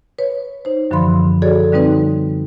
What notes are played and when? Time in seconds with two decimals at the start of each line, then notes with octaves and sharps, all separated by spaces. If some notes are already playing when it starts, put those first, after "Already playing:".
0.19 B4 C#5
0.65 D#4 C5
0.91 F#2 D3 E3 F3 B5 C6
1.42 F#4 G#4 A4 C#5 D5
1.73 D3 G3 C4 D#4 B4